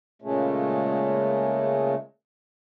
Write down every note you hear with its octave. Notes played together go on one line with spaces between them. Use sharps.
A#2 C#3 G#3 A3